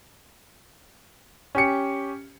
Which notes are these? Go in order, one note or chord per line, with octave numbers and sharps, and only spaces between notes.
C#4 G4 C#7